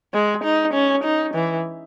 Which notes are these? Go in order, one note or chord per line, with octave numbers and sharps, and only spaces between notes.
G#3
D#4
C#4
D#4
E3